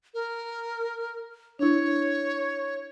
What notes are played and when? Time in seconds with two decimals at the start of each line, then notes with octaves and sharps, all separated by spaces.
0.14 A#4
1.59 D4 E4 C#5